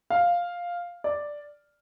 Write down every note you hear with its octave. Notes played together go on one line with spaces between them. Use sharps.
F5
D5